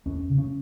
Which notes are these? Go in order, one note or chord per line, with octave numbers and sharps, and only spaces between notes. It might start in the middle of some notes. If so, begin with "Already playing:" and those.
E2 C#4
C#3
C#4